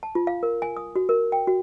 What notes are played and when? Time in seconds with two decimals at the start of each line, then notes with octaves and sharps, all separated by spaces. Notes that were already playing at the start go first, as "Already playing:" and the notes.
0.03 A5
0.15 F4
0.27 F5
0.43 A#4
0.62 G#5
0.77 D#6
0.96 F#4
1.09 A#4
1.32 G5
1.47 F#4